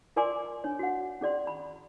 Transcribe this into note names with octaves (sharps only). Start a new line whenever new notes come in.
F4 A#4 D5 G#5 C6 D6
D4 C#5
F#4 F#5
C#4 G#4 D5 C6
B5